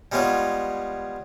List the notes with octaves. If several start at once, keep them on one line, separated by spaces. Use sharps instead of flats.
G3 G#3 B3 F4 C#5